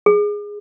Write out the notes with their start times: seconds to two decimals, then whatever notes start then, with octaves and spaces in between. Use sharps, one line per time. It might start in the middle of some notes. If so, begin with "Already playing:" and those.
0.06 G#4